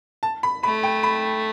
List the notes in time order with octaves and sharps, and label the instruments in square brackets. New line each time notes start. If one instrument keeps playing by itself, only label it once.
[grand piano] A5
B5
[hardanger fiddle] A3 [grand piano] B5
[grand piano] G5
B5